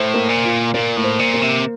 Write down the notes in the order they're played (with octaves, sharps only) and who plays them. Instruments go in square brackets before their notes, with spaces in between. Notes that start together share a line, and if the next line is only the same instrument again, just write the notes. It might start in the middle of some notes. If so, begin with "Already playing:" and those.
Already playing: [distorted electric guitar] A2 [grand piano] C5
[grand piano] A#3
[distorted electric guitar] A#2
[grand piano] F4
[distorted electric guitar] A#2 [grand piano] A#3
[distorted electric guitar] A2
[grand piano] C5
[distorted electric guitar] A#2
[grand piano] A#3
[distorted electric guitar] C3